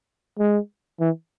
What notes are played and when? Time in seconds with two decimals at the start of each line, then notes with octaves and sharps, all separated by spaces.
0.39 G#3
1.00 E3